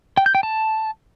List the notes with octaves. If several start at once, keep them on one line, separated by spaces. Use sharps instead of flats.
G5
G6
G5
A5